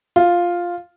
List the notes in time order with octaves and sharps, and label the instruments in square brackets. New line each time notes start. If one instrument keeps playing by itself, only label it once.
[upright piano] F4